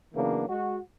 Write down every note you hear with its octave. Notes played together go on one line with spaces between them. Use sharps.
C#3 E3 F#3 A#3 B3 D4
G#3 F#4